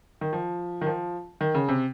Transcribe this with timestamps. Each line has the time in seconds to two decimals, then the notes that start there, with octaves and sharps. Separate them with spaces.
0.21 D#3
0.33 F3
0.81 D#3
0.86 F3
1.41 D#3
1.55 C#3
1.69 C3